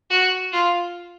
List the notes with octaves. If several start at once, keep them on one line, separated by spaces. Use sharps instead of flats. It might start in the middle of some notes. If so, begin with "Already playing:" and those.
F#4
F4